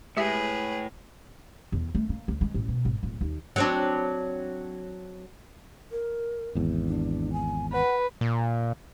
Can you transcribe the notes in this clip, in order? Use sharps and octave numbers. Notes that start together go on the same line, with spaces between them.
A2 G#3 G4 G#4 B4 E5
E2
A3
A#3
D2
G#3
A1
B2
G#1
D1
D#2
F#3 C4 D4
A#4
G#1 E2
D4
G#5
B4 F#5
A#2